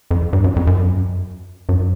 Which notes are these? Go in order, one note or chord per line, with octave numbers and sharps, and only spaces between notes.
F2
G2
F#2
F2
F#2
F#2